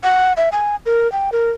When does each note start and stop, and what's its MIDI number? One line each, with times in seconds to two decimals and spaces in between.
0.04 0.33 78
0.37 0.49 76
0.52 0.76 80
0.86 1.10 70
1.12 1.30 79
1.32 1.51 70